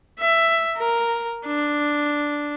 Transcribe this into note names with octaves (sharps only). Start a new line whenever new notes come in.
E5
A#4
D4